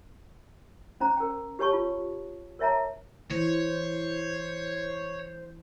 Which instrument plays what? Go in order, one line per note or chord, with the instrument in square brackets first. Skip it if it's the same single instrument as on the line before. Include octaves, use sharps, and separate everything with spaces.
[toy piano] C#4 C5 A#5
A#4 G5
G4 B4 C#5 A5 C#6
F4
A#4 C#5 E5 A5 A#5
[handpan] E3 [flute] C5 [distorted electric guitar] C#5